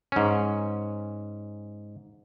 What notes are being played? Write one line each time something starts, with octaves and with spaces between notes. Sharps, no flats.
G#2 C#4